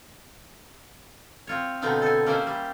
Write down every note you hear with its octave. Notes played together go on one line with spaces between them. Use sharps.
C4 F4 C#5
B2 D3 B3 C4 D#4 F5
A4 G#5
A#3 C#4 G4 C5 E5 G#5
G3